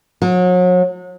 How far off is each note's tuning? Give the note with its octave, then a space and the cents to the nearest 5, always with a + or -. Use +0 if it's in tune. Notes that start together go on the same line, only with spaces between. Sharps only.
F#3 -35